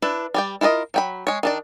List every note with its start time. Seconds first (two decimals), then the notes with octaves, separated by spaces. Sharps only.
0.02 D4 E4 B4
0.34 G3 D5 G5
0.61 E4 F4 A#4 D5 D#5
0.94 F#3 G5 B5
1.27 G#3 C#5
1.43 D#3 D4 D5